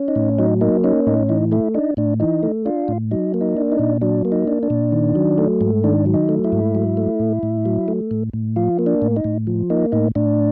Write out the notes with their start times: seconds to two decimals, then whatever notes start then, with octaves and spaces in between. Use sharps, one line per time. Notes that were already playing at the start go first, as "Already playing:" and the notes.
Already playing: C#4
0.08 D#4
0.16 A2
0.38 F#3 D#4
0.61 A#3 D#4
0.84 C#4 D#4
1.07 A2 D#4
1.29 E3 D#4
1.52 A3 E4
1.74 D4 D#4
1.97 A2 D4
2.20 E3 D#4
2.43 A3
2.66 D4 F4
2.88 A2
3.11 F#3 D#4
3.34 A#3
3.41 D#4
3.57 D4
3.72 D#4
3.79 A#2
4.01 F#3 D4
4.25 A#3
4.32 D#4
4.47 D4
4.63 D4
4.70 A#2
4.92 D#3
5.15 F#3
5.38 A3
5.61 G#2
5.84 D#3 D4
6.06 F#3
6.14 D#4
6.29 A3
6.44 E4
6.52 G#2
6.75 F#3
6.97 A3
7.20 A2
7.43 A2
7.65 F#3
7.88 A3
8.11 A2
8.33 A2
8.56 F3 F4
8.79 A#3
8.86 D4
9.02 A2
9.16 D#4
9.24 A2
9.47 F3
9.70 A#3 D#4
9.92 A2 D#4
10.15 A2 D4